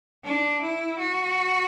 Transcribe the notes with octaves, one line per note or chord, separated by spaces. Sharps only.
D4
E4
F#4